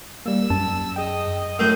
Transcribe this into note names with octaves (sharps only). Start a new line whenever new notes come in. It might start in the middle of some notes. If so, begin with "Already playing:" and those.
G3 A#3 E6
F#2 A5
G#4 D#5 G5
F#2 A2 E6 G6